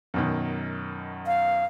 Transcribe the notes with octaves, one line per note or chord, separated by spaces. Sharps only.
F#2 B2 D#3
F5